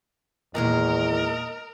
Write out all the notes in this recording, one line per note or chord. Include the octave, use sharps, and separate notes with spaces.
E2 A#2 D#3 G#3 A#4 D#5